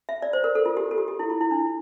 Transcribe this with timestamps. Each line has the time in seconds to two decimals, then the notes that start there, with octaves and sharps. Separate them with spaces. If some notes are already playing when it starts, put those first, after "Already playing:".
0.09 E5
0.22 D5
0.33 C5
0.44 A#4
0.55 A4
0.66 F4
0.77 G4
0.91 A4
0.98 G4
1.08 G4
1.19 E4
1.30 F4
1.41 E4
1.51 D4